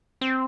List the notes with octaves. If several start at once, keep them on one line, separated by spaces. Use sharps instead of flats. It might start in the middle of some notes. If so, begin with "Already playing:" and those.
C4